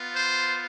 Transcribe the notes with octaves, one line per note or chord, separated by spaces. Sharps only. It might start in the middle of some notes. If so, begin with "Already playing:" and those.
Already playing: B3 F4
C5